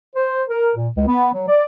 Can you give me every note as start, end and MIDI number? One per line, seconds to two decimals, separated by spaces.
0.16 0.43 72
0.49 0.71 70
0.76 0.89 46
0.95 1.04 37
1.08 1.33 59
1.34 1.46 54
1.49 1.66 74